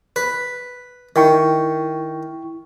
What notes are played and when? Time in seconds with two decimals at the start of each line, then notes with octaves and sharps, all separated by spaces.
0.16 B4
1.16 D#3 E4 G5 C#6